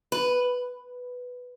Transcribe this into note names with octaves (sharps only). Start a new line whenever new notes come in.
B4